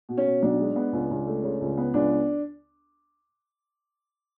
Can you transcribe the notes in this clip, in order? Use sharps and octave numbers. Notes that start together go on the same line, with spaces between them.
B2
C#4
B2
B1 D4
G#3
B3
C#2
C#2
A3
C#3
C#2
B3
C#2 D4
B3